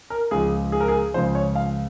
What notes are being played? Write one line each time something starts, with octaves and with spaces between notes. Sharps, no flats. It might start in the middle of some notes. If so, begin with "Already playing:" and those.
A#4
C#2 C#3 F3 G#4
G#4
A#4
G#4
C#2 C#3 F3 C5
C#5
F5